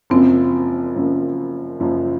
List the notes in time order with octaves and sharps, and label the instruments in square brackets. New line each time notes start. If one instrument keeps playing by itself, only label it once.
[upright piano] F#1 F#2 F3 [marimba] C4
[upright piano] F#1 F#2 F3
F#1 F#2 F3